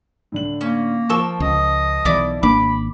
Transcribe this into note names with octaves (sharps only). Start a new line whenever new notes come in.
A2 D3 F#7
A#3 C#4
F3 A#4 A5 C#6 E6 G7
C#2 D#5
B1 E3 E4 D5
G#1 A#3 D4 B5 D6